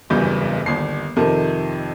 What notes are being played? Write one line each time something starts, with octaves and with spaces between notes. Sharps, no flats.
F#1 B1 E2 G2 E3 G6
G1 D#2 C7
F2 C3 D#3 A4